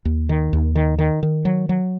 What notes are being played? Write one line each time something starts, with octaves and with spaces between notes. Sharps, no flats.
D#2
D#3
D#2
D#3
D#3
D#3
F#3
F#3